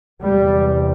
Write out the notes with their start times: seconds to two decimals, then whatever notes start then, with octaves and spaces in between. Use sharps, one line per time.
0.22 E2 C3 G3